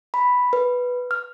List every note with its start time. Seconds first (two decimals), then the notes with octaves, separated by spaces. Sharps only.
0.14 B5
0.53 B4
1.11 F6